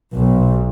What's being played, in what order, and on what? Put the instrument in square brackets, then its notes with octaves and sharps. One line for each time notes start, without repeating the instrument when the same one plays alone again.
[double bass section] B1